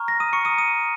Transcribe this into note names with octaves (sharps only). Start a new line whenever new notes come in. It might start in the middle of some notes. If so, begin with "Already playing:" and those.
Already playing: A#5 C#6 F6
A#6
D#6 D#7
C#6 C#7
D#6 D#7
A#5
D#6 D#7